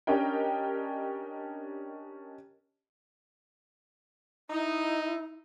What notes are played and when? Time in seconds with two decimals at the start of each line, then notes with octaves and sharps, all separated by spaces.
0.07 C#4 D4 G4 A#4 D#5 G5
4.50 D#4 E4